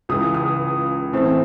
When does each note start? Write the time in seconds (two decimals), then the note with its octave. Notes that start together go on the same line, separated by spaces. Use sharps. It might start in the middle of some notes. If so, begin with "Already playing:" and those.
0.09 C#2 C#3 E3 D#6
0.34 D#6
1.13 A2 E3 C4